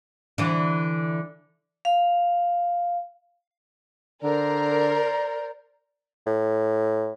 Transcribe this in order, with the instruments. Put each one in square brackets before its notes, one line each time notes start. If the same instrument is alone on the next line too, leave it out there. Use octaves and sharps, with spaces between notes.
[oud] D3 E3
[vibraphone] F5
[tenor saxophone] D3 [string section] A#4 [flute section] C5 D5 A#5
[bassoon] A2